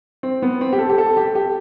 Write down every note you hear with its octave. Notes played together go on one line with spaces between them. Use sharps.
C4
B3
C4
G4
A4
G4
A4
G4
G4